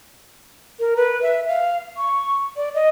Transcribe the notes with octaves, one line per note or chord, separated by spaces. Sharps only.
A#4
B4
E5
F5
C#6
D5
D#5